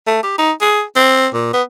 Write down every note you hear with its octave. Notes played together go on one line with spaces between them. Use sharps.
A3
G4
D#4
G#4
C4
A#2
B3